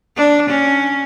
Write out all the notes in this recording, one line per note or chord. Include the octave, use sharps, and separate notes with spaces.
D4
C#4